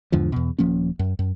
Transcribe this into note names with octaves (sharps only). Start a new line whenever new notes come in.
E2 G#2 D3 F3
E2 B2
D#1 F3 A#3 C#4
F#2
F#2